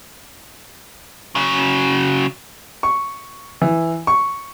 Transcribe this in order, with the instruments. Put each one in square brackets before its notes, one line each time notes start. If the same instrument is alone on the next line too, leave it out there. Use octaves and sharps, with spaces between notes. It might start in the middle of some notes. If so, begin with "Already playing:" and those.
[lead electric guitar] C#3 F#3
[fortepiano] C#6
E3
C#6